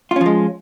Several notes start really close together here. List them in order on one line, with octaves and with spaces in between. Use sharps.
F4 C#4 F3 G#3